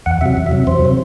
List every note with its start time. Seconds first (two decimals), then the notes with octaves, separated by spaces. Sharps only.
0.06 E2 F#5
0.21 C3 F#3 E5
0.37 E2
0.46 E5
0.52 C3 F#3
0.67 E2 C5
0.82 C3 F#3